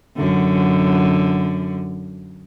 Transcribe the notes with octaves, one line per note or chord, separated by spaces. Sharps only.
F#2 D3